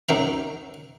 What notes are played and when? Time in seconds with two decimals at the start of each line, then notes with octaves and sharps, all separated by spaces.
0.09 F#2 D#4 E5 A#5